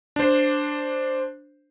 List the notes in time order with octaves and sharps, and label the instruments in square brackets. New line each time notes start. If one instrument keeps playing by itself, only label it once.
[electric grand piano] D4 C5